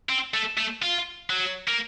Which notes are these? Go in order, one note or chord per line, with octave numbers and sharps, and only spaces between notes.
C4
A3
A3
F4
F#3
A#3